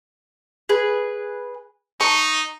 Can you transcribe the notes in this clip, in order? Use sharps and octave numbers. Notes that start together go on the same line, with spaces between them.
G#4 B4
D#4 C#6